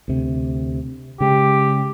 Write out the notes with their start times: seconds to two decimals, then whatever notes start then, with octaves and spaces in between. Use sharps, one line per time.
0.08 D2 C3
1.21 C#3 G#3 G4